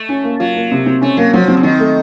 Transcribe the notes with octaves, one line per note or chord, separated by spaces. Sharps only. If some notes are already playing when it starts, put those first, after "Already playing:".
Already playing: A3
C#4
A#3
F#3 F4
A#3
C3
C4
A3 C#4
F#3 A#3
F3 F#3
C4
C#3
D#3 C4
A3